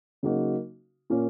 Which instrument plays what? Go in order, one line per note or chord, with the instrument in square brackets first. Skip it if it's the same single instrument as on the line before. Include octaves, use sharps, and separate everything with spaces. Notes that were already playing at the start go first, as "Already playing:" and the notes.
[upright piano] C#3 F#3 A#3 D#4 F#4
A#2 A#3 C#4 A#4